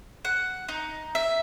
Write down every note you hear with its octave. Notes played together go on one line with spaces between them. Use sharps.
F#5
D#4
E5